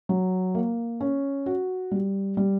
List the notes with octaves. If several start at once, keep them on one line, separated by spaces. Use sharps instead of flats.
F#3
A#3
C#4
F#4
G3
G3